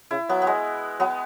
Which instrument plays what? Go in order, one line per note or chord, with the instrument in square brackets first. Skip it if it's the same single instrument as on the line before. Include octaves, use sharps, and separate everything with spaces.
[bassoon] C#3 [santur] E4
[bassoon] F#3 [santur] B3
[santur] B3
G#3
[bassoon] F#3 [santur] B3